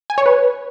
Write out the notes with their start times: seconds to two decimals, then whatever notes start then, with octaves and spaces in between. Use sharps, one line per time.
0.10 G#5
0.18 C#5
0.26 B4